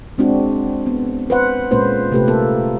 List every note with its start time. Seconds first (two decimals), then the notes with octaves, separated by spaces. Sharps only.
0.18 G#3 C4 D4 F#4
0.87 B3
1.30 B4 C5 F#5
1.71 A#2 G#3 A#3 C#4 B4 C5
2.12 C3 A3 G4 A4 B4
2.28 A#3 A4